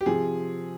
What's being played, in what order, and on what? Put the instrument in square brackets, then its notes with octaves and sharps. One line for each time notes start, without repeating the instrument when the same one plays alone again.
[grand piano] G4
C3 F3 G#4